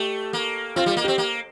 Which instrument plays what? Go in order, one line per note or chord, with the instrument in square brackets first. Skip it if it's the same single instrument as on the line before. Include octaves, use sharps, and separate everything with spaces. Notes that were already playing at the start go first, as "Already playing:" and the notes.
Already playing: [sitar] A3 [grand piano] G4
[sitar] A#3
[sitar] C4 [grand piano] F4
[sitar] G3
A#3
[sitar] C4 [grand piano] G4
[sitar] A#3